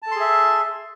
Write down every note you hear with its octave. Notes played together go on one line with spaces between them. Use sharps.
G#4 A4 E5 A5 C6